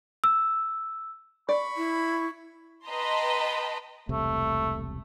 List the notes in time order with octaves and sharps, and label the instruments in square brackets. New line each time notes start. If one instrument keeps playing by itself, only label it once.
[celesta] E6
[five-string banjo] D5 [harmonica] B5 C#6
[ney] E4
[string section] B4 D#5 G5 A5 A#5 C6
[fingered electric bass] E1 C2 C3 [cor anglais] A3